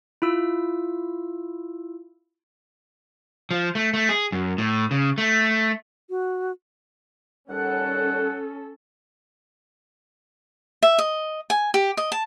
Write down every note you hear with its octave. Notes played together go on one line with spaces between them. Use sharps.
E4 F4 E6
F3
A3
A3
G#4
F#2
A2
C#3
A3
F#4
D#2 G3 C#4 A4 F#5
E5
D#5
G#5
G4
D#5
A5